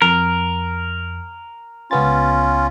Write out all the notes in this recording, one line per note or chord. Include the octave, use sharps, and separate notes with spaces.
F2 A#4
C#2 B3 C#4 F4 A6